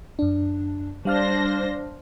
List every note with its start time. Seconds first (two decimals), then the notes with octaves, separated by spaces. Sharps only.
0.19 F#2 D4
1.05 G3 D4 C5 F5 F6 A#6